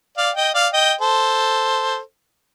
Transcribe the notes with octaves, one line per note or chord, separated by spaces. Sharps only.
D5 F5
D#5 G5
D5 F5
D#5 G5
A4 C5